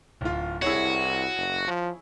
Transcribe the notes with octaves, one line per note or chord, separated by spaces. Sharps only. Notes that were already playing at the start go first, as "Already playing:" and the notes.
D1 F4
C2 E4 F#4 G#4 C#5
F#1
F3